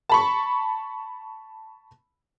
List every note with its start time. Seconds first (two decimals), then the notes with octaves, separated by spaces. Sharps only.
0.09 A5 B5 C#6